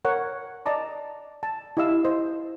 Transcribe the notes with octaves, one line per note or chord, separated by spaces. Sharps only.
A#4 C#5 F#5
D5 D#5 A5 A#5 D6
A5
E4 G4 D#5 F5 E6
C5 D#5